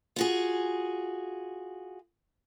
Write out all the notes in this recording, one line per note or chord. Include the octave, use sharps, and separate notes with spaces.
F4 F#4 G#4